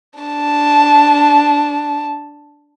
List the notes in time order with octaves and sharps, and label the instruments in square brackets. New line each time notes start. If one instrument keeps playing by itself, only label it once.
[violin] D4 A5